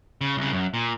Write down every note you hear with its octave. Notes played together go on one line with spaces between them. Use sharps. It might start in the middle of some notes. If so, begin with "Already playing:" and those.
C#3
C2 C#3
F#2
A#2